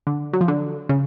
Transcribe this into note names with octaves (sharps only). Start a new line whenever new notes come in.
D3
F#3
F3
D3
C#3